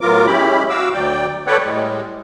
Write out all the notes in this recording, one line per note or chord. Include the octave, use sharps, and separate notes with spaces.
A2 F#3 B3 F4 A#4 D6
G#3 C#4 E4 G4 B5
F#4 F5 D6 E6
D2 F#3 D5 G5
A4 B4 C#5 D5 F#5 G5
A2 G3 G#3